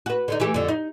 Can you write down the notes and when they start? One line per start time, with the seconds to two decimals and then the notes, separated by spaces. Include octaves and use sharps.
0.06 F#4 B4
0.28 D3 D4 D#4
0.40 E3 A3 G4
0.54 F2 D3
0.68 D#4